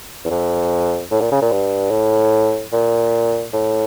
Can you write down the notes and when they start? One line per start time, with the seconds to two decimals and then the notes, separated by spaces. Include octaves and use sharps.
0.25 E2
0.30 F2
1.11 A2
1.21 A#2
1.31 C#3
1.42 A#2
1.51 G2
1.91 A2
2.72 A#2
3.53 A2